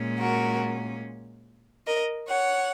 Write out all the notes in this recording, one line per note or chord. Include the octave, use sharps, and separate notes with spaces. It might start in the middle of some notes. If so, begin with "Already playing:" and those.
Already playing: A#2 G#3 C#4
F#4 A#4
A#4 D#5
C#5 F#5